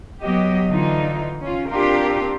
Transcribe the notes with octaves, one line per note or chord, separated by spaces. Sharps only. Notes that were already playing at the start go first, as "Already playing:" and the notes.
F#3 B3 G4 D#5
D3 E3 D#4 F4
C#4 F4
C4 D4 F4 G4 A#4